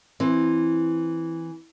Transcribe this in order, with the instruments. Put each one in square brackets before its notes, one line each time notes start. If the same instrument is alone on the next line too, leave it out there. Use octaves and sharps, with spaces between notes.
[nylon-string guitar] E3 C4